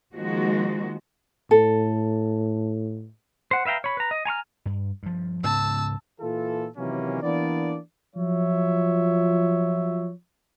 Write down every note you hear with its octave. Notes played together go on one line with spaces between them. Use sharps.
D#3 F3 G#3 A#3 F#4
A2 A4
C5 F#5
B4 E5 F5 G5 A#5
C#5 B5
B4 A#5
D#5
G#5 A#5 C#6 F6
G2
G2 F3
G#2 C#3 B3 A5 E6
A#2 E3 F4 A4
C3 D#3 E3 F#3 A#3 C#4
E3 A#3 B3 D4 D5
F3 F#3 F4 C#5 E5